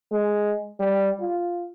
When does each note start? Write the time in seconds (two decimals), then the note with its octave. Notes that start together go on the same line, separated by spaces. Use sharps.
0.11 G#3
0.79 G3
1.21 F4